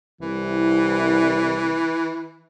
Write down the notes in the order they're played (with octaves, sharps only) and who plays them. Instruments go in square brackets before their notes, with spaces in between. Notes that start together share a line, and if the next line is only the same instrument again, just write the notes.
[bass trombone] C2 [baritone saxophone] E3